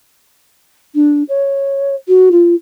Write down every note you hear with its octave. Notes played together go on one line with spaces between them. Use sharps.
D4
C#5
F#4
F4